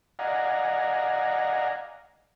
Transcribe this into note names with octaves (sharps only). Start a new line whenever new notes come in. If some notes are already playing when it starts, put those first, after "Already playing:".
D5 D#5 F5 F#5 G#5 A#5